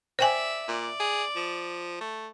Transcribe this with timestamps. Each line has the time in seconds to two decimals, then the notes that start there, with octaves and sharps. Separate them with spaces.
0.19 C5 D5 E5 G5 G#5
0.68 A#2 D5
1.00 G#4
1.36 F3
2.01 A3